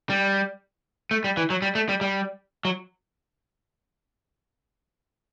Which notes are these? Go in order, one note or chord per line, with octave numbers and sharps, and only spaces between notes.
G3
A3
G3
E3
F#3
G3
A3
G3
G3
F#3